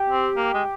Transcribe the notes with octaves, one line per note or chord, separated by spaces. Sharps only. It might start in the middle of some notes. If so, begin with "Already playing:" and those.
Already playing: G4
C4
A#3
G#3